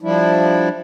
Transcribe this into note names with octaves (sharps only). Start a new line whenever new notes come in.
F3 G3 D4 E4